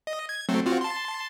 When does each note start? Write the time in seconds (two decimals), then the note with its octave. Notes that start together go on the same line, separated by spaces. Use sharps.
0.07 D#5
0.29 G#6
0.49 F#3 A3 C4
0.66 C4 F4 F#4
0.81 A5 C6